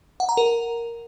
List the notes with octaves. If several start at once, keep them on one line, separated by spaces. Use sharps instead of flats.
F#5
A#5
A#4